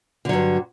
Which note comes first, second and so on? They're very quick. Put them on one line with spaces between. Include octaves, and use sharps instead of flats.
D3 F#3 G2